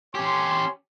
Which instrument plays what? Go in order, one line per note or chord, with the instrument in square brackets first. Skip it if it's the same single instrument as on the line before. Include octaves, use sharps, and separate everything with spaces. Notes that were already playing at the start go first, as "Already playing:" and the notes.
[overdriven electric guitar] C#4 G4 [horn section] C#5 G#5 C6